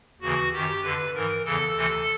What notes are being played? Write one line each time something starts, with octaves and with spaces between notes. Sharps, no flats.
D#2 C#3 E3 F#4
F#2 D#3 G4
F2 D3 B4
G#2 E3 A#4
E2 C#3 E3 A4
D2 C3 E3